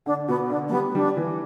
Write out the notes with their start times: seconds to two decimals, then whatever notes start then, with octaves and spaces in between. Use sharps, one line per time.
0.06 D3 D4
0.28 B2 B3
0.50 D3 D4
0.68 A3
0.72 G3 B3
0.95 G3 D4
1.17 E3